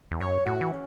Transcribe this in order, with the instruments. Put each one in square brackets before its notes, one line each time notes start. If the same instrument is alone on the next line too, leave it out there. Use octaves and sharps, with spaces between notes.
[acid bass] E2
[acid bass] F#2 [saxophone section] C#5
[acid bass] A2 [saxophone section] F#4
[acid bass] E3
[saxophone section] C#4